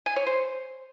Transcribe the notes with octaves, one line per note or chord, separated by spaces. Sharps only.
G#5
C#5
C5